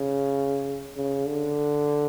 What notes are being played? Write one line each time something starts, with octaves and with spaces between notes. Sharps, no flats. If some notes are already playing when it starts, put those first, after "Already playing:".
Already playing: C#3
C#3
D3